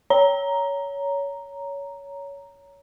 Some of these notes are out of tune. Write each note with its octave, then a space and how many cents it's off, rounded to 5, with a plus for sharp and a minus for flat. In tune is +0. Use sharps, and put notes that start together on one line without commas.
C#5 +20 A#5 +0